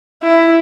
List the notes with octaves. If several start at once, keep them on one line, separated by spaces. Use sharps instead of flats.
E4